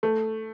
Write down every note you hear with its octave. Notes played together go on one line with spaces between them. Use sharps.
A3